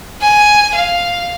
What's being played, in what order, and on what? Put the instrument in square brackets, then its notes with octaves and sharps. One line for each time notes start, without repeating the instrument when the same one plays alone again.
[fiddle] G#5
F5